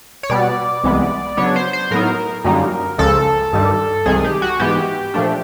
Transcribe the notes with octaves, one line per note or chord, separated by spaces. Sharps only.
C#5
B2 G3 B3 D5
C2 C3 E3 G#3 B3
C#3 F#3 B3 D4 C#5
C5
C5
A2 F#3 B3 D#4 A#4
F#2 D3 G3 A#3 D#4
C#2 C#3 F3 A4
G2 D#3 G3
C2 C3 D#3 G#3 G#4
G4
F#4
G#2 E3 G#3 B3 G4
A#2 F3 A3 D4